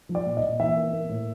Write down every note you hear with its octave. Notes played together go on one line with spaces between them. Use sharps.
F3
D5
A#2
D#5
A#2
E3 E5
A#3
A#3
A2